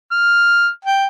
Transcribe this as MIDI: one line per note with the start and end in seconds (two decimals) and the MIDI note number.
0.11 0.69 89
0.85 1.07 79